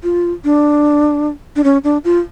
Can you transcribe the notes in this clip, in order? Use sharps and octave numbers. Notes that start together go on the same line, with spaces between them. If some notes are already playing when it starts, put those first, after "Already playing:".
F4
D4
D4
C#4
D4
F4